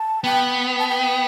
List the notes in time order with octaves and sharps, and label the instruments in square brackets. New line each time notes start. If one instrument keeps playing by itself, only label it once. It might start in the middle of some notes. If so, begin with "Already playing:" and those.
Already playing: [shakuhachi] A5
[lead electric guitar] B3 [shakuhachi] G5
[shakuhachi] A5
G5